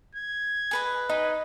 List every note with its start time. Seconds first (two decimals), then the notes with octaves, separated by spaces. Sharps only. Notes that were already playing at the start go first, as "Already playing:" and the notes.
0.15 G#6
0.71 G#4 B4 D#5
1.10 D#4 B4 D#5